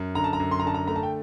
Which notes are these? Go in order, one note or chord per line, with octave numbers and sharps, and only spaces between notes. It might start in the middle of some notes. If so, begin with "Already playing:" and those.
Already playing: F#2
D3 A#5
A5
A#5
F#2
C6
A#5
D3 A5
A#5
A3 A#5
A5
G5